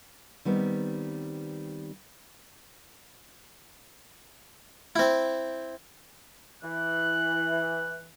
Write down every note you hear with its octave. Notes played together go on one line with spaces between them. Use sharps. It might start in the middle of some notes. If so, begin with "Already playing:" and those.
D#3 G3 B3 C4
C4 E4
E3 F#6